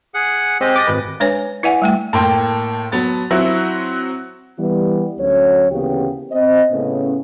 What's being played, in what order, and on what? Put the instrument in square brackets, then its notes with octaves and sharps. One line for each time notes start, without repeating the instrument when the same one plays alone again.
[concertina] G#4 F#5
[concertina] G#3 G4 D#5 [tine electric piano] C4
[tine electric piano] D6 A6 A#6
G#1 B4
[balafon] G#3 D4 B4 C#5 G#5
E4 B4 D5 E5 F#5 G#5
G3 A3 G5
[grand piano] A2 A#3 G5 [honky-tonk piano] A5 C6
[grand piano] F#3 B3 A6
[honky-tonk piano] F#3 C4 F#4 [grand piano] E4
[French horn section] E3 G3 B3
D2 F#3 C#4 C#5
D2 C#3 E3 A#3 B3 G4
C4 D#5
A2 C#3 B3 C#4